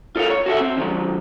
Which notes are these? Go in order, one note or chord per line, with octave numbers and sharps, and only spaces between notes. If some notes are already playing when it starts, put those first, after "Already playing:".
F4 A4 A#4 F5
C#5
F#4 A4 E5
C4
D#3 F#3